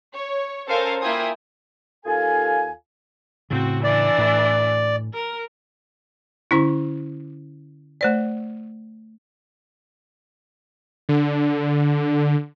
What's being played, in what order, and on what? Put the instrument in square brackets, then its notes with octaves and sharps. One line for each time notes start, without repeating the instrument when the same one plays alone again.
[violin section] C#5
C#4 A4 A#4 C5 F5 G#5
A#3 E4 F4 G5 G#5 D#6
[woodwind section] D#2 F4 A4 F5 G#5
[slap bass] A2 C#3 [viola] C4 F#4
[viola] E3 D4 [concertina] D5
[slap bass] A2
[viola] A#4
[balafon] D3 C#4 E4
A3 C5 D5
[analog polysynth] D3